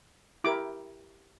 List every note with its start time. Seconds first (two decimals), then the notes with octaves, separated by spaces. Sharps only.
0.44 E4 G4 A#4 D6